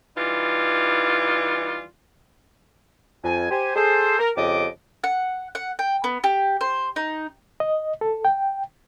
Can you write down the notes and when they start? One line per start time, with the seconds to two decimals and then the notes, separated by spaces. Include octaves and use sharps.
0.17 E3 G3 D#4 F4
3.24 F2 G#5
3.50 G4 C5 G#5
3.76 G#4 A4 C5
4.19 A#4
4.36 F2 C#3 G4 D#5 D6
5.04 F#5
5.55 F#5
5.79 G5
6.04 B3
6.24 G4
6.61 C5
6.96 D#4
7.60 D#5
8.01 A4
8.25 G5